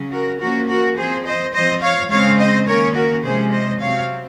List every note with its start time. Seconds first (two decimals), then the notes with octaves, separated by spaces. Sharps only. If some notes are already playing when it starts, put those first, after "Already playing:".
Already playing: C#3 F#3 C#4
0.12 F#4 A#4
0.40 F3 A#3 C#4 F#4 A#4
0.69 F#4 A#4
0.97 F3 C4 G#4 C5
1.25 C5 D#5
1.53 F3 C4 C5 D#5
1.82 C#5 F5
2.10 C#3 G#3 C4 C#5 F5
2.39 C5 D#5
2.67 D#3 A#3 C#4 A#4 C#5
2.95 F#4 A#4
3.24 C3 F3 G#3 C#4 G#4 C5
3.52 C5 D#5
3.80 C3 F#3 C4 C#5 F5